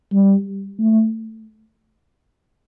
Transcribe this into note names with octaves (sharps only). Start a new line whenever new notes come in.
G3
A3